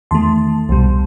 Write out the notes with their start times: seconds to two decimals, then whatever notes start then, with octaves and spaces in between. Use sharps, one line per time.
0.11 E2 D#3 A3 A5 C6
0.69 C2 B2 G3